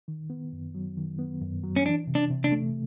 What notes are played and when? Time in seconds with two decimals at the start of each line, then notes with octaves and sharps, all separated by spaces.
0.08 D#3
0.30 B3
0.53 F#2
0.75 F#3
0.97 D#3
1.19 B3
1.41 F#2
1.64 F#3
1.76 C#4
1.86 E3 D4
2.07 C3
2.15 D4
2.30 C3
2.44 D4
2.52 A3